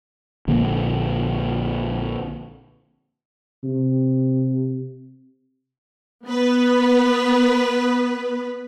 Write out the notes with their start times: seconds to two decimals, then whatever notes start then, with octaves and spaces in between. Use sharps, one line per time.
0.48 A#1 D3 A#3
3.64 C3
6.26 B3 B4